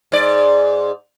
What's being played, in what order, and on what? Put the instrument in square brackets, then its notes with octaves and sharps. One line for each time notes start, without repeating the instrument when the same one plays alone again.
[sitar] G#2 D5